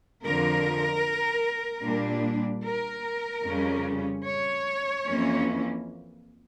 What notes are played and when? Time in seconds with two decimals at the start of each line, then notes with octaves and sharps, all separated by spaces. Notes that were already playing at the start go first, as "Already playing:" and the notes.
0.23 F2 D3 F3 A#4
1.84 A#2 G3 D4
2.65 A#4
3.45 F2 C#3 G3 C#4
4.25 C#5
5.06 F2 E3 A#3 C#4